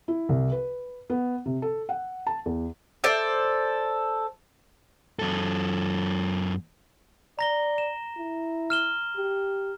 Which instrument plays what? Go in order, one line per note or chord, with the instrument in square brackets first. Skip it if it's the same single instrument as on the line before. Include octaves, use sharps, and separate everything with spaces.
[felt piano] E4
C2
B4
B3
C3
A4
F#5
A5
E2
[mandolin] A4 C5 D5
[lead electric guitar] F#2 A4
[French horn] D5 [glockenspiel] A#5 A#6 G7
[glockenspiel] E7
[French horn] E4
[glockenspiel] F6 E7 G7
[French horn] G4